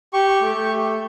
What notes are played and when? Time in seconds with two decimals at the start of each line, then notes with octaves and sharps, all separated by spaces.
0.13 G4 C#6
0.41 A3